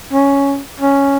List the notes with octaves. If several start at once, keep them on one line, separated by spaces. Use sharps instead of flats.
C#4
C#4